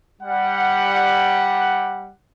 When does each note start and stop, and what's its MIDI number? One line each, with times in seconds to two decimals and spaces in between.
0.22 2.13 55
0.22 2.13 78